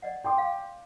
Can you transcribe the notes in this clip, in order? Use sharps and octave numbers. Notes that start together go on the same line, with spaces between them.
D5 D#5 F#5
G5 C6 D6
F5